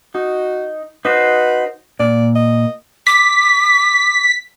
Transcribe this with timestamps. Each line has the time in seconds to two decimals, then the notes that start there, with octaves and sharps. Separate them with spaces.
0.15 D#4 F#4
1.05 D#4 F#4 B4 C5
2.00 A#2 D5
2.35 D#5
3.07 D6 B6